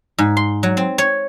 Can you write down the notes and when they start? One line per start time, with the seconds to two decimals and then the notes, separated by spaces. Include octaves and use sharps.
0.18 G#2
0.37 C6
0.63 F#3
0.77 C4
0.98 C#5